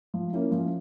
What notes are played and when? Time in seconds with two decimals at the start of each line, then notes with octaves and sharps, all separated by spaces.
0.14 F3
0.33 A#3 C#4 E4
0.51 F3